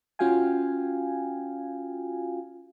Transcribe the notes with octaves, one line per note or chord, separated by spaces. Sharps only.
C#4 F4 F#4 F5 G5 G#5